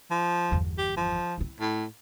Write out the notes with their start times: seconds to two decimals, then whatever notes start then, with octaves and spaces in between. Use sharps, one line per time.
0.11 F3
0.52 G1 E2
0.78 G4
0.97 F3
1.38 C4 E4
1.60 A2